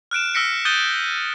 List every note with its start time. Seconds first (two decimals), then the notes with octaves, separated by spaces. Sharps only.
0.11 F6 F#6 D7 E7
0.34 E6 F6 A#6 B6 C#7 D7
0.65 D#6 F#6 G6 A6 D#7 G7